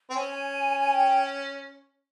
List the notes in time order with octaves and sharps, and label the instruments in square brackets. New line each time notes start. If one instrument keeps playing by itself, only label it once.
[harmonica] C4
[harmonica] C#4 [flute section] G#5
[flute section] G5